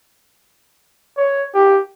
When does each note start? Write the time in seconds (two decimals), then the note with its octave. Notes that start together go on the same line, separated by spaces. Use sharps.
1.17 C#5
1.55 G4